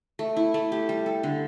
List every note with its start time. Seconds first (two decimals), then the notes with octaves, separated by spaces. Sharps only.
0.19 A3
0.37 E4
0.54 A3
0.72 G4
0.89 G3
1.06 A4
1.23 D3